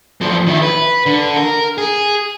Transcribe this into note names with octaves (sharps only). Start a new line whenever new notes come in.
E2 F3
D#3 E4
B4
D3
A#4
G#4